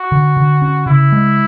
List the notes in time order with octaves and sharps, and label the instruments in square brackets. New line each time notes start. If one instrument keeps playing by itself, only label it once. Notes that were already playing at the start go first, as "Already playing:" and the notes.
Already playing: [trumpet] F#4
[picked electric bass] D3
D3
C#4
[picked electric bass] C#3 [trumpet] E4
[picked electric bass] G#3